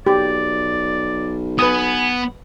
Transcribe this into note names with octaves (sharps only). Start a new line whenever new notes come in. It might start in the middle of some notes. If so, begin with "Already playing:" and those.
B1 G4 D5
B3 B4 G#5 D#6